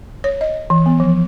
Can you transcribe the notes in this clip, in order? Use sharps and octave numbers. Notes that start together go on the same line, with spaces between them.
C#5
D#5
E3
B3
F3